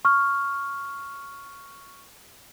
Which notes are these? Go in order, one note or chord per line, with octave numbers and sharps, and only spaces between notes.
C#6 F6